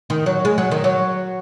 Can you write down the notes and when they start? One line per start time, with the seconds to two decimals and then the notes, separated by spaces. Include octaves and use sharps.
0.10 D#3
0.26 F#3
0.45 G#3
0.58 F#3
0.71 D#3
0.84 F#3